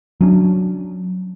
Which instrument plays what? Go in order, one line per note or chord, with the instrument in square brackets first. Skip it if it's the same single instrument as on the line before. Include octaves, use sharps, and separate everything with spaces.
[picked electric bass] F#3 C#4 D4